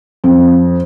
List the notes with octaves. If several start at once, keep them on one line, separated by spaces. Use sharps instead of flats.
F2